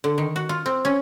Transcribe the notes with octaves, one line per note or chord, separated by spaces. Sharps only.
D3
D#3
F#4
F4
C4
C#4